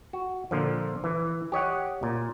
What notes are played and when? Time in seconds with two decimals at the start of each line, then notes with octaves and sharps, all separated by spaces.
0.13 F#4
0.51 A#2 D3 F3
1.04 E3
1.52 G4 C#5 D#5 F#5
2.03 A#2